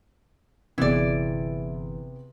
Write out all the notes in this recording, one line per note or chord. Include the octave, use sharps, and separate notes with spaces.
G1 C3 E3 B3 E4 G#4 D5